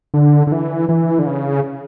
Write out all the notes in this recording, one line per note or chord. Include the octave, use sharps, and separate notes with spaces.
D3
D3
E3
E3
D3
C#3